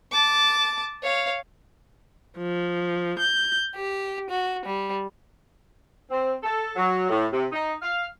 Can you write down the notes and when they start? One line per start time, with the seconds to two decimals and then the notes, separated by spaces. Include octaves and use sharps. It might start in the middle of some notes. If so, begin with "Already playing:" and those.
0.11 A5 D6
1.03 C#5 F5
2.37 F3
3.19 G6
3.75 G4
4.29 F#4
4.65 G3
6.10 C4
6.43 A4
6.76 F#3
7.09 A2
7.32 C3
7.52 D#4
7.81 F5